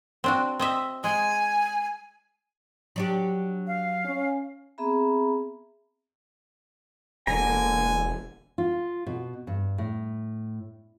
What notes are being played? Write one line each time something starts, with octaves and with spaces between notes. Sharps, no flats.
C4 D4 F#4
C4 D#5 E5
G#3 G#5
F#3 D4 G4
F5
C#4
B3 C4 G#4 E5 A#5 B5
E1 D3 A#3 G#5 A#5
F4
B2
G2
A2